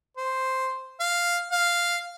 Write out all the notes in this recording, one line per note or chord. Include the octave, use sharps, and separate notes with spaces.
C5
F5
F5